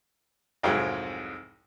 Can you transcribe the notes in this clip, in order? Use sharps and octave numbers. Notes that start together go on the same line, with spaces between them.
C2 F2 G#2 F#3 G#4 G5